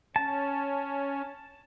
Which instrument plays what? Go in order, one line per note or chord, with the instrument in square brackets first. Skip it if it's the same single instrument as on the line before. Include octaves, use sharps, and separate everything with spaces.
[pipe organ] C#4 [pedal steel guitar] A5